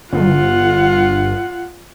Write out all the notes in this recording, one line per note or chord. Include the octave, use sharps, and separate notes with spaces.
G1 F4 F#5